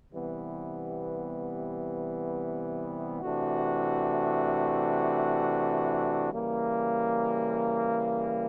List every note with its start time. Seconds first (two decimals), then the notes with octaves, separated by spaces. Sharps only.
0.12 C3 E3 G3 B3
3.22 C3 E3 A3 D4 F#4
6.32 C#3 E3 G3 A#3